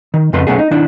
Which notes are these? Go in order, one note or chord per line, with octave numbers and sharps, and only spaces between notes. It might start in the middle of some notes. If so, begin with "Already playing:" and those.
D#3
F2 C#3 A3 B4 C6
B1 F2 A3 B3 C#4 G#4
D#4
D#3 D4 E4